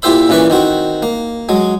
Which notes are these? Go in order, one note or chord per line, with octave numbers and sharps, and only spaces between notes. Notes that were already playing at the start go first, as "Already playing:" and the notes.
A#2 E4 G4 C5 E5 B5
A#2 C#3 E3 B4 D5 C#6
D#3 C4 F#4
A#3
F#3 G#3